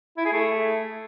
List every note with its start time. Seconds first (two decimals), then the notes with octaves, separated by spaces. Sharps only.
0.17 E4
0.25 G#4
0.33 A3